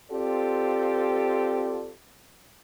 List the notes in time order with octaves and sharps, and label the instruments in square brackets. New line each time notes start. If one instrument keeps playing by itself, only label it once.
[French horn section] C4 F4 G4 A4 D5